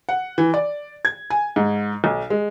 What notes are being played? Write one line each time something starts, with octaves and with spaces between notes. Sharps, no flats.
F#5
E3
D5
G#6
G#5
G#2
B1
G#3